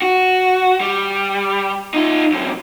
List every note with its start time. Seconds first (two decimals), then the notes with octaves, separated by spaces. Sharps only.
0.02 F#4
0.80 G3
1.94 D#4 F4
2.32 F#2 C3